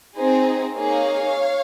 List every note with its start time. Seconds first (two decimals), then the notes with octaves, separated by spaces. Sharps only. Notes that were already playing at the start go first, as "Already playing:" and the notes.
0.17 C4 D#4 G#4 C5
0.77 A#3 D#4 G#4 C#5 F5